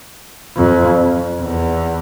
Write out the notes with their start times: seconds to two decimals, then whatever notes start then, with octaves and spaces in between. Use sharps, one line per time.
0.57 F2
1.41 E2